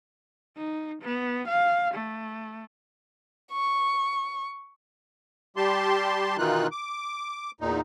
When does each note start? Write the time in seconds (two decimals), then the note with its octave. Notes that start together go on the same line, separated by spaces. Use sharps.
0.57 D#4
1.02 B3
1.48 F5
1.94 A3
3.52 C#6
5.57 G3 G4 A5 C6
6.38 B2 D#3 E3 D#4 F4 F#6
6.71 D6
7.61 E2 A#2 D#4